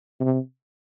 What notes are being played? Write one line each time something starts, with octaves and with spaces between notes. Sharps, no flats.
C3